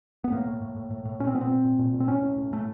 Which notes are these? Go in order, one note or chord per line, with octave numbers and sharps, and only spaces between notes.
B3
A2 A#3
A2
A2
A2
A2
A2
A#2 C#4
C4
A#2 B3
C4
A#2
A#2
A#2
A#2
C4
A2 C#4
A2
A2
A2 A3